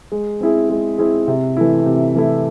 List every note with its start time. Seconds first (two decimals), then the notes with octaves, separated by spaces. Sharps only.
0.12 G#3
0.41 C4 E4 G#4
0.70 G#3
0.98 C4 E4 G#4
1.28 C3
1.57 E3 A3 E4
1.86 C3
2.15 E3 A3 E4